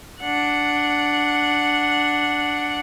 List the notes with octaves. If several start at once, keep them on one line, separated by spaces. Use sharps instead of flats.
D4 F#5